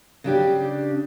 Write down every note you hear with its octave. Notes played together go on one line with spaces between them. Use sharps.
C#3 D4 G4